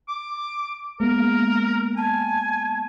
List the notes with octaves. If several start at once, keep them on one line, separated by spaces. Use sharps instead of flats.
D6
G#3 A#3 B3 A#4
G#5 A5